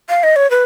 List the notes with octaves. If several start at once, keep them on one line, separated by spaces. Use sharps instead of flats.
F5
D#5
C#5
B4